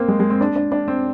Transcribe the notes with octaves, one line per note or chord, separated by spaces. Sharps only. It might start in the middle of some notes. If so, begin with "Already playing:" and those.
Already playing: A#3 C4
G#3
G#3
C4
D4
D4
D4
C4